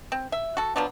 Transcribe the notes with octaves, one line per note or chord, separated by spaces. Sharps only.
C4
E5
F#4 A4
F3 F#3 B3 D4